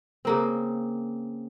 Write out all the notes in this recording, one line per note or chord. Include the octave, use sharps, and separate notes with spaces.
C#3 A#3 C4